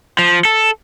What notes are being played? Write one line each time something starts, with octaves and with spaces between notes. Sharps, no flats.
F3
A4